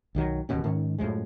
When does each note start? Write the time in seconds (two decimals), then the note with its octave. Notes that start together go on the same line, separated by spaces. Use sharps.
0.15 B1 D#3 F#3
0.49 D1 D#2 B2 C#4
0.64 G#2 D#3 C#4
0.98 F#2 A2 F3 G#3